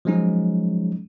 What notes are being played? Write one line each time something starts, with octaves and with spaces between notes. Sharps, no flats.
F3 F#3 G#3 C#4 D#4